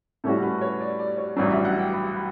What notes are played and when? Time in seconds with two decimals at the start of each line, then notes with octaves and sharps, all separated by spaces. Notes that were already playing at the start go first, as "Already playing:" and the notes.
0.24 A2 G3 C#4 F#4 A4
0.42 B4
0.61 C#5
0.81 D5
0.99 D5
1.18 C#5
1.36 A1 G2 F#3 D5
1.51 E5
1.65 F#5
1.79 G5
1.93 B5
2.16 B5